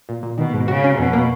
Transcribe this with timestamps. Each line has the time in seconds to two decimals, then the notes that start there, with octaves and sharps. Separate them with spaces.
0.09 A#2
0.23 A#2
0.38 B2 D#3
0.54 G#2
0.68 C#3 F#4
0.84 C#4
0.98 F2 B2
1.13 A#3